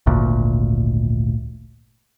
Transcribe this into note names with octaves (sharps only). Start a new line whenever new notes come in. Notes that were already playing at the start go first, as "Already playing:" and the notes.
G#1 D2 A#2